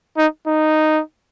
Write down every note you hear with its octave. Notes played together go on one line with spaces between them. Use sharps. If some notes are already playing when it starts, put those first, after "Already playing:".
D#4
D#4